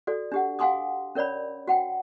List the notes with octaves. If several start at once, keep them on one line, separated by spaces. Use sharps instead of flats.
F#4 A4 D5
D4 G4 F#5
F5 F#5 G#5 C6 D6 D#6
C#4 A#4 C#5 D5 B5
F#4 F#5 G5